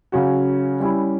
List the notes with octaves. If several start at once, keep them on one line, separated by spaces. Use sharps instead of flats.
C#3 F#3 C#4 F#4
G3 C#4 E4 G4